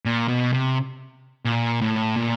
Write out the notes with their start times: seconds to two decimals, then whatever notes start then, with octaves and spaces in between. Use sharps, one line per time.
0.05 A#2
0.28 B2
0.53 C3
1.45 A#2
1.81 A2
2.16 A#2